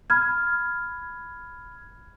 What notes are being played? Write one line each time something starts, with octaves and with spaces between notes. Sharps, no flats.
B5 F6 G#6